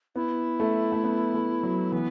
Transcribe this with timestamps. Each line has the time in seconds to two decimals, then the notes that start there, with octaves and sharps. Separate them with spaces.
0.15 B3 E4
0.60 A3
0.92 A3
1.04 B3
1.34 A3
1.63 F#3
1.92 E3 B3